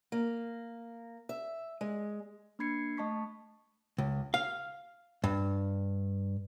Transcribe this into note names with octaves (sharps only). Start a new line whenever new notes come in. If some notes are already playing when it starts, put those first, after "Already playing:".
A#3
E5
G#3
A#3 D4 B5 G#6 C7 C#7
A3 D#5 A5 C#6 B6
C#2
F5
G2